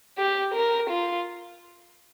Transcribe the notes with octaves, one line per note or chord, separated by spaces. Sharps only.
G4
A#4
F4